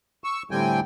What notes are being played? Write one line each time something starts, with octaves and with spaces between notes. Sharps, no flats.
C#6 E6
A2 D3 G3 C4 G5 G#5